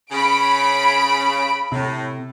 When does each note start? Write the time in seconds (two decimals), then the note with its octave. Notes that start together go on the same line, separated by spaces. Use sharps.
0.12 C#3 B5 D7
1.72 A2 C3